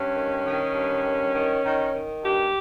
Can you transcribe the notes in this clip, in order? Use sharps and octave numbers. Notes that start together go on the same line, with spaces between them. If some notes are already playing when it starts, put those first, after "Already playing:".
Already playing: G2 C#4
D#3
D#3
G2
D#3
D#3
D#3
D#3
G2 G4